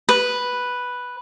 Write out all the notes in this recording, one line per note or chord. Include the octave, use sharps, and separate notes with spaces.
B4